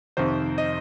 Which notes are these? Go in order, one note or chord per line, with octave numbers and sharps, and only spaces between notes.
F2 C3 D#3 C5
D#5